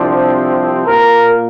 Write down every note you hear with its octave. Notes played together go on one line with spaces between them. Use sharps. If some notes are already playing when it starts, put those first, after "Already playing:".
Already playing: C2 C3 F3 C4 D4
A#2 A#3 A#4